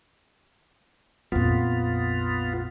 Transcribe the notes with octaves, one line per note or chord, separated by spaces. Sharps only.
A#1 F2 B3 F4